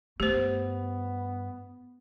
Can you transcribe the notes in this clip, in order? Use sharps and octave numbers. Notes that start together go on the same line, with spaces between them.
G2 A3 B3 G4 C5